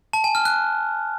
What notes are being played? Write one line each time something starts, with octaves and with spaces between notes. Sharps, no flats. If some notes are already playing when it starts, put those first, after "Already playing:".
A5
G#5
F6
F#6